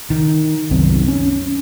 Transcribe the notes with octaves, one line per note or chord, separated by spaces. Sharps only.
D#3
C2 F#2 D#3 C4
C#4